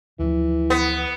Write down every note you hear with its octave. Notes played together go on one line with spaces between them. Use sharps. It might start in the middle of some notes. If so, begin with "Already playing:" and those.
D2 E3 F3
B3